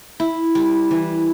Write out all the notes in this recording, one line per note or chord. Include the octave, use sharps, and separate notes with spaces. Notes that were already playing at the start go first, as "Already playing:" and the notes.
E4
G3
E3